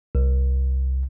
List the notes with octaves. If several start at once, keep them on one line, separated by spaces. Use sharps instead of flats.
C2